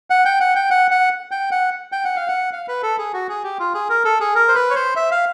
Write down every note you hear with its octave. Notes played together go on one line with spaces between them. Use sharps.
F#5
G5
F#5
G5
F#5
F#5
G5
F#5
G5
F#5
F5
F#5
F5
B4
A4
G#4
F#4
G#4
G4
F4
G#4
A#4
A4
G#4
A#4
C5
B4
C#5
C5
E5
F5